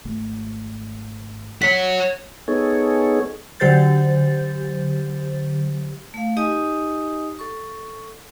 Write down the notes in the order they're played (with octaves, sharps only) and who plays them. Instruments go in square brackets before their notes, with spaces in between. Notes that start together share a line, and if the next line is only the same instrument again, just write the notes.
[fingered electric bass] G#1 A3
[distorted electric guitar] F#4 C#5 [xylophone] B6
[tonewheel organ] B3 D#4 G#4 A4 C#5
[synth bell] D3 F#3 G4 C5 G6 A6
[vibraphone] A3 F5
D#4 G4 D#5 G#5 D#6
A4 C#6